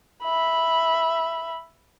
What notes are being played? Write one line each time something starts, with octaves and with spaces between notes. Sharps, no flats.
E5 B5